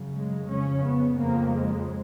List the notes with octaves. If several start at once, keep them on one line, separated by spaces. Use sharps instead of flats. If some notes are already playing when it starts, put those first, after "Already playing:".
Already playing: F#2 C#3
G#3
F2 C#3 C#4
B3
F2 C#3 A#3
G#3